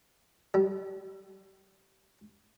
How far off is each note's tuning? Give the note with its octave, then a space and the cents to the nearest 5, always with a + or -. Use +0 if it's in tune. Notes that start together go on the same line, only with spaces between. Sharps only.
G3 -35